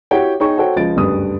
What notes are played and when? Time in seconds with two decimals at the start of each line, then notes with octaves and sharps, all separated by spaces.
0.11 E4 F#4 G4 C#5 F#5 G5
0.40 D#4 G#4 C#5 G5 C#6
0.57 F#4 A4 C5 C#5 G5
0.76 C#2 F3 D#5 A6 D7
0.96 F#1 D2 G2 B4 D#6